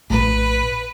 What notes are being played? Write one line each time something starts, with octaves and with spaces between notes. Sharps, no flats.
A#1 A2 B4